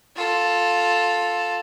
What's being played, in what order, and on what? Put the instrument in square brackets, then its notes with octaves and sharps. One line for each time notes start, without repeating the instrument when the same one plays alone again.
[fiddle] F4 A4